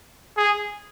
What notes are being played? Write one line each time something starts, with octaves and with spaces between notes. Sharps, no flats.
G#4